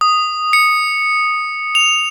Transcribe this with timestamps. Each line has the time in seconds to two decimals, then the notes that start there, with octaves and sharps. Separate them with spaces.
0.01 D#6
0.53 C#7
1.75 F7